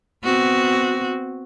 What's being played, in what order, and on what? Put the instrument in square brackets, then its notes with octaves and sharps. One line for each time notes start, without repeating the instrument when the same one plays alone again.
[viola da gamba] B3 C4 F#4